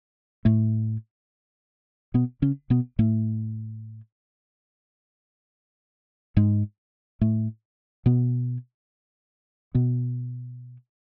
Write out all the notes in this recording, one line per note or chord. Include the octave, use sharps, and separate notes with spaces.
A2 A3
B2 B3
C#3 C#4
B2 B3
A2 A3
G#2 G#3
A2 A3
B2 B3
B2 B3